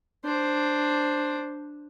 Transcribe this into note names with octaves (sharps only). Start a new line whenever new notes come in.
D4 C5